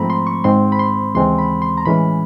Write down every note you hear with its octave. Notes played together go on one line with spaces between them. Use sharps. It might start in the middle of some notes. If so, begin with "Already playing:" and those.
Already playing: G#2 F3 A3 C4 A#5 B5
C6
C#6
G#2 D#3 G#3 C4 C6
B5
C6
D#2 C#3 E3 G#3 C4 C6
B5
C6
A#5
A2 E3 G#3 C#4 B5